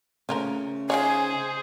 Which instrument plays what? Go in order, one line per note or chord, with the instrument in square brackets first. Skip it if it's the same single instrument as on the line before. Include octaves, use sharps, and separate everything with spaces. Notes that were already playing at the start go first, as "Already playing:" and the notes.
[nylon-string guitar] C#3 A3 [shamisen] F3 F4 A#4
[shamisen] D#3 F4 C#5 [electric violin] G#4 C5 [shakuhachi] G#5